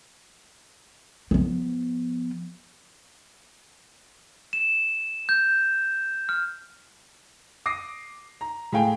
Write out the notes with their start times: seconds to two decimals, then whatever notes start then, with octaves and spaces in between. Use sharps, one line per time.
1.31 F3 B3
4.53 E7
5.29 G6
6.29 F6
7.66 D6 D#6 A#6 C7
8.41 A#5
8.72 A2 G#4 F5 G5 G#5